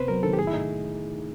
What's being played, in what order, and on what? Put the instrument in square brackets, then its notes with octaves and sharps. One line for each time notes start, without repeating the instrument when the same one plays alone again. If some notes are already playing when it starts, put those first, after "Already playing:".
Already playing: [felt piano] C3 B3 [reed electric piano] B4 C5
[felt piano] F#3 [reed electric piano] A#4
[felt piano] D#3 [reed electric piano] A4
[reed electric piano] G4
[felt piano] A2 [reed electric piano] G#4
[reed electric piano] E4
[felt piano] A2 [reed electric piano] D#4